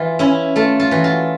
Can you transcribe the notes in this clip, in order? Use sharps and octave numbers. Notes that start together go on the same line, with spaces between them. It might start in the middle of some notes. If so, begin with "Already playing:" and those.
Already playing: E3 F4
C#4 E4
A3 F4
F4
E3 F#4
F4